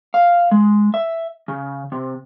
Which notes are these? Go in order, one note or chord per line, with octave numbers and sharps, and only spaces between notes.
F5
G#3
E5
C#3
C3